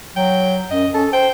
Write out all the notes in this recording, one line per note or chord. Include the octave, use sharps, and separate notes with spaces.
F#3 G5
F#2 D#5
C#4 A4
C5 G5